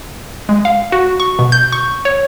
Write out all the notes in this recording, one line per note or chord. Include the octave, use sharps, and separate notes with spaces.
G#3
F5
F#4
C#6
B2
G6
C#6
C#5